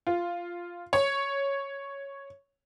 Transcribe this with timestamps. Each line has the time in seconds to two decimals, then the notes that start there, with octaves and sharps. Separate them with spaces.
0.07 F4
0.93 C#5